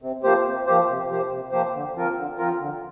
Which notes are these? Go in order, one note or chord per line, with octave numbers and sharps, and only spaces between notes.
C3
F3 A#3 G4 C5
C3
F3 A#3 G4 C5
C3
F3 A#3 G4 C5
C3
F3 A#3 G4 C5
D3
F3 C4 F4 A#4
D3
F3 C4 F4 A#4
D3